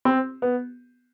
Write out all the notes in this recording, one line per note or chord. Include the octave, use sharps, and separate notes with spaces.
C4
B3